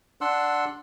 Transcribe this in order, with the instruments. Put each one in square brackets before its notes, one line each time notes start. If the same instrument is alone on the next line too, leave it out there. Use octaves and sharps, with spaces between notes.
[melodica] D4 F#5 C6 E6